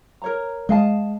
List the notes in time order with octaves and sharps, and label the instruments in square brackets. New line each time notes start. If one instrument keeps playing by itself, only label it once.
[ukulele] A#4 C#5 A#5
[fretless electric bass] G#3 [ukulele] D#5 F5 A5